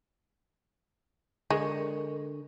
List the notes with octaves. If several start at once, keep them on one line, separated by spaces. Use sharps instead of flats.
D3 G#3 A#4 C#6